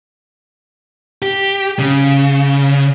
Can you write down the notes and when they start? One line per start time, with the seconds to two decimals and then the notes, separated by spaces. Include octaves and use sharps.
1.22 G4
1.79 C#3